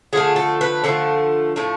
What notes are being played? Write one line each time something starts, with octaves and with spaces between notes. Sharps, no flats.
D3 F3 A3 G#4
A4
B4
D3 F3 A3 C4
A2 F3 A3